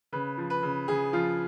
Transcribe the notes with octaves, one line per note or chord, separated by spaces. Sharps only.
C#3 B4
F3
B4
C#3
C#3 G#4
F3 F4